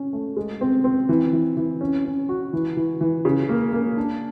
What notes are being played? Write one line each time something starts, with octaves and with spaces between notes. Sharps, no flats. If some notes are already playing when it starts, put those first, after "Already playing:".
Already playing: C#4
A3
G#3
C4
C4
E3
E3
E3
C#4
C#4
F#4
E3
E3
E3
C#3
A#3
A#3
D4